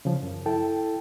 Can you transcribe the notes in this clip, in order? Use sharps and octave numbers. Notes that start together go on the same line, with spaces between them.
C#3 F3
F#2
E4 A4 G5 A5